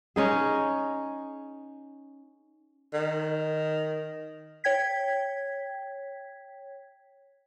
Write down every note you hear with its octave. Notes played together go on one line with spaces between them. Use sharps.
C#4 D#4 G#4
D#3
C#5 G5 G#6 B6